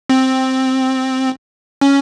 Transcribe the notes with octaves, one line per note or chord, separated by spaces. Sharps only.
C4
C#4